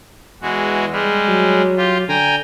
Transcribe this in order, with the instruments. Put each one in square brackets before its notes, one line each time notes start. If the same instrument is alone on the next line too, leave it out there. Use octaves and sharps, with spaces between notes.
[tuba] E2 [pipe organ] E3 G#3 F#4
[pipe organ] G3 G#3
[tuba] F#3
[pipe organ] F4 G4
[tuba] D3 [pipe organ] G5 G#5 A#5